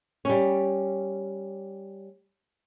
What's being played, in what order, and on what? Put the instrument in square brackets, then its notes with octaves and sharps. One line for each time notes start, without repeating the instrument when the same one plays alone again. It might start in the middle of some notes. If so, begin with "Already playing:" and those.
[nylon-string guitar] G3 C#4